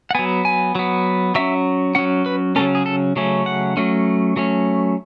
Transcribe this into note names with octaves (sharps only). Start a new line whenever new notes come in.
F#5
F#3 B3 G#5
G#5
F#3 B3
F#3 C#4 E5
F#3 C#4 F#5
B4
C#3 F#3 A3 C#4 A4
G#4
A4
C#3 F#3 A3 C#4
F#5
F#3 A3 C#4
F#3 A3 C#4